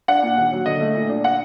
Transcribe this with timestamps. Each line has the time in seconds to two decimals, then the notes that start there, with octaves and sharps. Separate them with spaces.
0.08 D4 F#5
0.23 A#2
0.38 D#2
0.52 F#3
0.66 D3 D#5
0.81 A3
0.95 A#2
1.09 D4
1.24 F#5